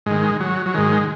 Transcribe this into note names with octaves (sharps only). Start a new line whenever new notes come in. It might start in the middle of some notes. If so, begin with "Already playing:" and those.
G#2 D#3 G#3
F#3
F#3
G#2 D#3 G#3